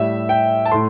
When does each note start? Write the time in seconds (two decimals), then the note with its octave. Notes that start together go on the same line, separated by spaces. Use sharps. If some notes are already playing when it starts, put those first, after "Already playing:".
Already playing: A2 G3 E5
0.29 G5
0.65 A5
0.71 A2 A3 C6